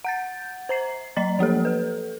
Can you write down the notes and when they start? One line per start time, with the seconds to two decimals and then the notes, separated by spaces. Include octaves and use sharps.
0.05 F#5 G6 A6
0.69 C5 A#5 C7
1.16 F#3 D#5 A#5 A6
1.39 F3 A#3 G4 A4
1.65 A4 B4